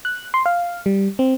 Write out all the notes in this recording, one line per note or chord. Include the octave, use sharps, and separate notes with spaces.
F#6
C6
F5
G3
C4